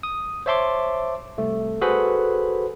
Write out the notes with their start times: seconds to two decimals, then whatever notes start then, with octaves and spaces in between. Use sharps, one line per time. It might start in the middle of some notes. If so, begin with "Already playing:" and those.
0.03 D#6
0.46 C5 C#5 E5 A5 C6 D6
1.38 C2 A3
1.81 F#4 G#4 A4 B4 C5 B5